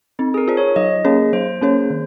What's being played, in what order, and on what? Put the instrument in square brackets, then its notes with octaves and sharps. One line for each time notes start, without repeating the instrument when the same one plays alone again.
[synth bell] C4 [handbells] D#4
[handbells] G#4
A#4
[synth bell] F4 C5
[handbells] C#5
[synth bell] F#3 [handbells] D#5
[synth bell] A#3 C#4 G#4 C#5
[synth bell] F#3 [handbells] C5
[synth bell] A#3 C#4 G#4 C#5
D#3